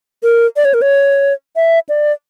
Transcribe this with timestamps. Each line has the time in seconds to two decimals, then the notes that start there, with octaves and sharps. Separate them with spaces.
0.23 A#4
0.56 D5
0.65 C#5
0.74 A#4
0.82 C#5
1.56 E5
1.89 D5